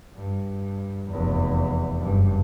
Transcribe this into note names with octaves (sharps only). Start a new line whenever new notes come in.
G2
F1 E2
F#1 G2